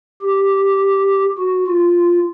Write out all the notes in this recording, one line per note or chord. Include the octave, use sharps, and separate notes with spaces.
G4
F#4
F4